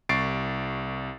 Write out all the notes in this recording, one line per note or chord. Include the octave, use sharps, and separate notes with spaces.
C2 C#6 A6 C7 D7